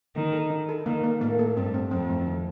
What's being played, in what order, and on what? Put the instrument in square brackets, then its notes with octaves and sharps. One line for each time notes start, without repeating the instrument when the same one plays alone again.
[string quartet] D#3 [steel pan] A#3
[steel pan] A4
D#4
A4
[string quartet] D#3 [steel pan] A#3
[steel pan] A#3
[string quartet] A2 [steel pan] A#3
[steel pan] A4
[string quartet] G2 [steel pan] C4
[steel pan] C4
[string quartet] F2 [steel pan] C4
[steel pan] A3
D#3